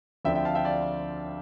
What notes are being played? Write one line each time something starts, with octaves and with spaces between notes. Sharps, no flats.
D2 D3 F3 C4 E5 G5
E5 G5
F5 A5
E5 G5
D5 F5